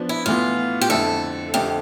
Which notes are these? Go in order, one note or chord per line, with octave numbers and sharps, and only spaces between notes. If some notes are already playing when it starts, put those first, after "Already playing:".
Already playing: F3 B3 D4
E4
A2 E3 B3 F4
G4
F2 D3 A3 E4 A4
F2 D3 A3 G4